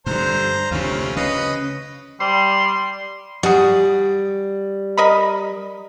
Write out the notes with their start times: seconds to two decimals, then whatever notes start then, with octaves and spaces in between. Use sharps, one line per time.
0.06 G2 D3 C5 A#5
0.71 D2 C3 C4 C#4 F4
1.16 C#3 B4 D#5
2.20 G3 C6
3.43 G3 F#4 G#4
4.97 A#4 D#5 B5